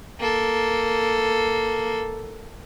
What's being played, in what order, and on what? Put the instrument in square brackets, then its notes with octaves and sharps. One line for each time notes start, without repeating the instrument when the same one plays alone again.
[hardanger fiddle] A#3 A4